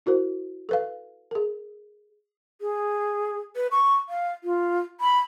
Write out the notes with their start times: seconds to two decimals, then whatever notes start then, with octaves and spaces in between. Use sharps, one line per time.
0.06 E4 F#4 A#4 C5
0.69 A4 B4 F5
1.31 G#4 A#4
2.61 G#4
3.56 B4
3.71 C#6
4.09 F5
4.44 F4
5.01 B5